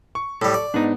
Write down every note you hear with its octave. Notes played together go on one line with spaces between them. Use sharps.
C#6
A2 G3 A4
D5
G#2 B3 D4 D#4